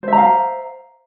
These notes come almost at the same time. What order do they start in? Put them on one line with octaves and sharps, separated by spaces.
C5 E5 A#5 F5